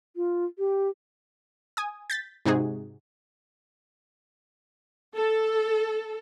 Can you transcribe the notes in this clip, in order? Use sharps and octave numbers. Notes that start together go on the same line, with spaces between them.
F4
G4
G#5 D#6
G6 A6 B6
G#2 C3 D#4 F#4 G#4
A4